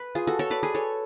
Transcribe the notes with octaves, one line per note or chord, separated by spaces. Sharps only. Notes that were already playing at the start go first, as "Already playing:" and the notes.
Already playing: B4
F4 G#4
F#4 A4
A4 C#5
B4 D5
G#4 B4
A4 C#5